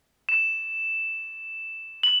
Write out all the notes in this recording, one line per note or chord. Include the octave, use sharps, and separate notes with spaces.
E7
F#7